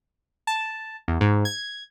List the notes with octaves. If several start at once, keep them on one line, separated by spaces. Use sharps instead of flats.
A5
E2
G#2
G#6